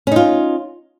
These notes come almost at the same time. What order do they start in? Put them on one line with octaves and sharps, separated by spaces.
C#4 D#4 F4